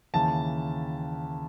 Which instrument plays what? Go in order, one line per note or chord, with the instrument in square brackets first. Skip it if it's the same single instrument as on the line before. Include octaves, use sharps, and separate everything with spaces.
[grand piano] D#2 C#3 E3 A5